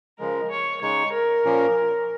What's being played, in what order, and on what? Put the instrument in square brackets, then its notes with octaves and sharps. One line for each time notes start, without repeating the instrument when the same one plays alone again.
[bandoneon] C#3 F3 G#3 [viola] A#4
[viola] C#5
[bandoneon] C#3 G#3 D#4 [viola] C#5
[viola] A#4
[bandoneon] A#2 F3 A#3 C#4